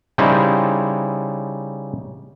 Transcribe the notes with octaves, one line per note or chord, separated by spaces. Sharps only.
C#3 G3 D#4 E4 C5